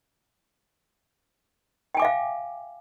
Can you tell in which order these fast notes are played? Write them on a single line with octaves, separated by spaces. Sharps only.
G5 G#5 D6 E5 F5